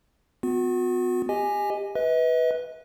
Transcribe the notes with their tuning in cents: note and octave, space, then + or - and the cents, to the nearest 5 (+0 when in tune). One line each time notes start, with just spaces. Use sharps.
B3 +30 F#4 -40
G4 +20 D#5 +0 G#5 +0
B4 +0 D#5 +45